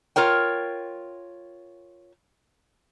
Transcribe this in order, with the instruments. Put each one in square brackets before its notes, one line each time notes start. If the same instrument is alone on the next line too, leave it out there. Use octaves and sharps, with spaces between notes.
[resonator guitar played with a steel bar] F4 A#4 C#5 G5